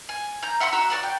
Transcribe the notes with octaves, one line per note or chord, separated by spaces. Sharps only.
G#5
A#5 G6
E5 F#5 B5 C6
F#4 A#5 E6 F#6
F#4 G#4 D5 F#5
G5